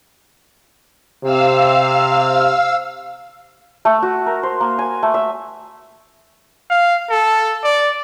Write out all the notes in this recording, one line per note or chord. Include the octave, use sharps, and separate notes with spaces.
C3 F5 E6
A3
F#4
A#4
C5
A#3
G#5
A3
E5
F5
A4
D5